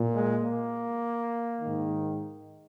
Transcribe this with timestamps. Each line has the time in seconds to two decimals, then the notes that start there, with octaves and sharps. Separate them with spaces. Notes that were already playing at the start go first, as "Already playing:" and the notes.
Already playing: A#2
0.14 G#3
0.43 A#3
1.61 G#2 D#3